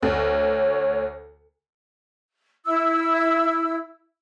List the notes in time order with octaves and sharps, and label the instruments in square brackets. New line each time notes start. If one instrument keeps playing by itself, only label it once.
[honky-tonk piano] D2 [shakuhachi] C#5
[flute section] E4 E6